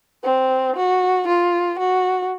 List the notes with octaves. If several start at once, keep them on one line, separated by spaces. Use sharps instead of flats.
C4
F#4
F4
F#4